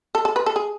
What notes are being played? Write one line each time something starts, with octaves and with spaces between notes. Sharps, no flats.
A4
A4
B4
A4
G#4